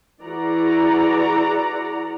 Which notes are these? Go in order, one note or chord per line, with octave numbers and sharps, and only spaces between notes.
E3 F#4 G#4 D5 F#5 A#5